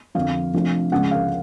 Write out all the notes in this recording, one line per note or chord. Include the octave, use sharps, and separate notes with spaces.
F2 D3 F3 F5
C3 F3 A3 D4
C#2 C#3 F3 G#3 F#5
F5